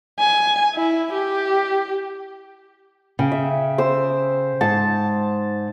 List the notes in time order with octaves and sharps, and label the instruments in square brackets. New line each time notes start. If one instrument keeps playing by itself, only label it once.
[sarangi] G#5
E4
G4
[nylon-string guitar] C#3 [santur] G5
[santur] E5
C5 E6
[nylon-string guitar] G#2 [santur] A5